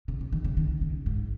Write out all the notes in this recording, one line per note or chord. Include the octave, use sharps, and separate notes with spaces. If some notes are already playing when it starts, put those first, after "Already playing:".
C#3
C#3
D#3
C#3
D#3
C#3
G#2